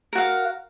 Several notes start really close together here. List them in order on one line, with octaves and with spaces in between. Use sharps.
A#4 F#4 F5